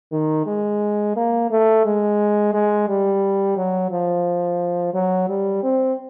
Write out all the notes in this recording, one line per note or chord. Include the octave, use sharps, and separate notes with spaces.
D#3
G#3
A#3
A3
G#3
G#3
G3
F#3
F3
F#3
G3
C4